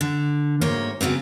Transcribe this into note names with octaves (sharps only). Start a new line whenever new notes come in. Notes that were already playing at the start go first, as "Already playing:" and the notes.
D3
D2 G#2 A#3 C5 C#5
C#3 F#3 B3 C4